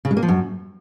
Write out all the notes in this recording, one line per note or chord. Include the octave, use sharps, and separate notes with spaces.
C#3
G#3
A#3
F3
F#2